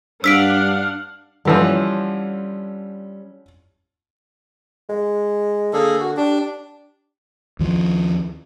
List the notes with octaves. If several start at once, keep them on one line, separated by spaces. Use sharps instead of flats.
G2 D4 F5 F#5 E6 F6 B6 D7
D3 E3 F3 G3 C#4
G#3
D3 A#3 G#4 A4
F#4
D4 G4
D#2 F3